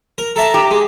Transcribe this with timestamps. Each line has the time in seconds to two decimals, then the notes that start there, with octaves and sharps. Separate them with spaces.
0.18 A#4
0.36 A4 E5 A5 A#5
0.54 G4
0.71 G#3